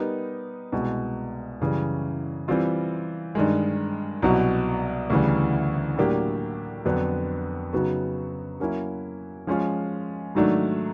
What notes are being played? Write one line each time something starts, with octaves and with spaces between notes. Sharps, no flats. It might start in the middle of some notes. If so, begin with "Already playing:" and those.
Already playing: G3 B3 D#4 G4 A#4
C2 B2 G#3
F#2 C#3 E3 G3
E3 G3 C4 F4
G2 D#3 G#3
C2 B2 F#3
D2 C#3 E3 G3
A2 F#3 A#3 D4 G4
F2 D3 F#3 B3 D4
C#3 F#3 B3 D#4 F#4
F#3 A#3 C#4 E4
F3 G#3 C#4 F4
G#2 D#3 F#3 A3 D4